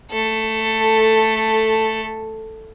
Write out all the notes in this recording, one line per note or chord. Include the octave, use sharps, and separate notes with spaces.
A3 A4